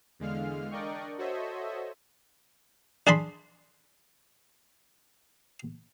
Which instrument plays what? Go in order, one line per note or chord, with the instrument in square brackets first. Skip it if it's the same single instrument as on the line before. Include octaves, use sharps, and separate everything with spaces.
[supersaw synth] E2 D3 G#3 F5 F6
D4 A#4 D5 D#5 G5 C#6
F#4 A4 C5 C#5 D#5 E5
[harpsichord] D4 G#4 A5 B5 C6